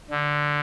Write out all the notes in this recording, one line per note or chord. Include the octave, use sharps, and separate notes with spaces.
D3